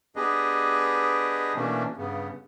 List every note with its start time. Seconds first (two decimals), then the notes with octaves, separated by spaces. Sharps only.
0.16 B3 D4 G4 G#4 B4 D#5
1.55 B2 E3 A3 A#3 C#4 D4
1.97 G2 C#3 B3